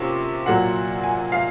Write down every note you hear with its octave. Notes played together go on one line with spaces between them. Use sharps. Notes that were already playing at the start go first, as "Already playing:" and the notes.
Already playing: C3 F3 A#3 C#4
A#2 F#3 A#3 F#5
G#5
F5